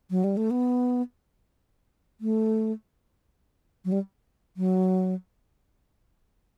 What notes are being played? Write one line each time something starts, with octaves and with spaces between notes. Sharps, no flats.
F#3
G3
A3
B3
A3
F#3
G3
F#3